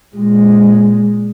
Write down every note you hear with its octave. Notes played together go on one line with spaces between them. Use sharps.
A#2 G#3